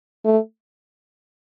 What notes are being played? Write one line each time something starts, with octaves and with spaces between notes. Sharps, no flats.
A3